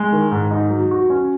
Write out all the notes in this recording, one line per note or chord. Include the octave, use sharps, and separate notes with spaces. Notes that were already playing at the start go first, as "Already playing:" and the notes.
Already playing: G#3
D#3
G#2
D#4
F#3
F#4
C#4